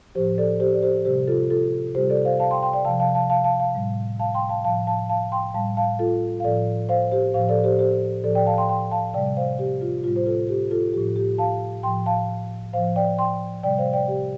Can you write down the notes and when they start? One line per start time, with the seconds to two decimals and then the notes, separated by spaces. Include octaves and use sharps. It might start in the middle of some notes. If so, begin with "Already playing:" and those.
0.15 A2 F3 G4 C5
0.38 A4 D5
0.60 G4 C5
0.74 D5
0.83 G4 C5
1.05 C3 G3 G4 C5
1.28 F4 A4
1.50 F4 A4
1.95 C3 G3 G4 C5
2.10 A4 D5
2.25 C5 F5
2.40 F5 A5
2.51 G5 C6
2.62 G5 C6
2.73 D5 G5
2.85 C3 F3 F5 A5
3.00 F5 A5
3.15 F5 A5
3.30 F5 A5
3.44 F5 A5
3.60 F5 A5
3.75 A2 G3
4.19 F5 A5
4.34 G5 C6
4.49 F5 A5
4.65 A2 F3 F5 A5
4.87 F5 A5
5.09 F5 A5
5.32 G5 C6
5.54 A2 G3 F5 A5
5.77 F5 A5
5.99 F4 A4
6.40 F5
6.44 A2 F3 A4 D5
6.89 C5 F5
7.12 G4 C5
7.34 A2 F3 C5 F5
7.49 A4 D5
7.64 G4 C5
7.79 G4 C5
8.24 A2 F3 A4 D5
8.35 D5 G5
8.47 F5 A5
8.58 G5 C6
8.69 G5 C6
8.91 F5 A5
9.14 C3 G3 D5 G5
9.36 C5 F5
9.59 G4
9.81 F4
10.04 A2 G3 F4
10.16 C5
10.26 F4 A4
10.49 G4
10.71 F4 A4
10.94 A2 F3 G4
11.16 G4
11.38 F5 A5
11.83 A2 F3 G5 C6
12.06 F5 A5
12.73 A2 F3 C5 F5
12.96 D5 G5
13.18 G5 C6
13.63 C3 G3 D5 G5
13.78 C5 F5
13.93 D5 G5
14.08 G4